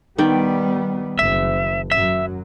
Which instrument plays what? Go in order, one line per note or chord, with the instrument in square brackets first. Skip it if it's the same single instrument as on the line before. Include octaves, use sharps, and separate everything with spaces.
[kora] D#3 D5 G5 [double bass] G3 B3
[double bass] F#1 [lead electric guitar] E5
[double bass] F#2 F#3 [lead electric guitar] E5